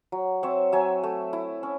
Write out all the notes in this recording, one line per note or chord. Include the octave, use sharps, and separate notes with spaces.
F#3
C4 C#5 E5
F#3 E5 G#5
A3
E4
C#4